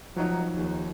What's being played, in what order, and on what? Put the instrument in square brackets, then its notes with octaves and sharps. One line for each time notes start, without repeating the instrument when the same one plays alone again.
[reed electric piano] F3 D#4 [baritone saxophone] F#3
[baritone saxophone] D#2